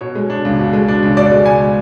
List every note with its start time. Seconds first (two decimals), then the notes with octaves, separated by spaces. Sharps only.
0.01 B2 C#5
0.15 G#3
0.30 D4
0.45 C#2
0.59 B2
0.73 G#3
0.88 D4
1.03 C#2
1.17 B2 D5
1.31 G#3
1.46 C#2 G#5